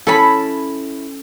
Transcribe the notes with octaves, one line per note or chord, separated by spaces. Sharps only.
C#4 E4 A4 A5 B5